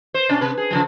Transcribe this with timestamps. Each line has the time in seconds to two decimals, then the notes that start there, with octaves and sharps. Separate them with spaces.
0.14 C5
0.29 B2 C#4 D4
0.41 C3 B4
0.57 G#4
0.71 C#3 F3 F#3